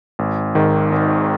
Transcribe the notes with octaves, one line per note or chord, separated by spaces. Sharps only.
G#1
G#2 D#3
G#1